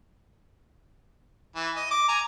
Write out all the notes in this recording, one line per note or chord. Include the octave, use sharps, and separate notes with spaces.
E3
D#5
D6
G#5 A#5